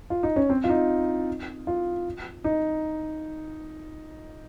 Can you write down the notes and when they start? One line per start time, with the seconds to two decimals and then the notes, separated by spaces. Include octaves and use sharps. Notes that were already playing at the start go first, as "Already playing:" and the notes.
0.10 F4
0.23 D#4
0.36 C#4
0.50 C4
0.64 F4
0.69 D#4
1.67 F4
2.44 D#4